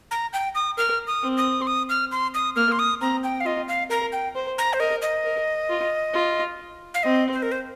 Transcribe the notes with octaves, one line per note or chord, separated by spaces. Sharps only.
A#5
G5
D#6
A#4 F6
D#6
C4
D#6
C6
D#6
F6
C6
D#6
A#3 F6
C6
D#6
C4 A#5
G5
F5
F4 D#5
F5
A#4 A#5
G5
C5
A#5
C5
A#4 D#5
D#5
A#4
F4
F4
F5
C4 D#5
C5
A#4
C5